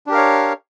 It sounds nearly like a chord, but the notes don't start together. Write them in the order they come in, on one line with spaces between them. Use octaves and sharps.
D4 G4 A#4 F5 C#5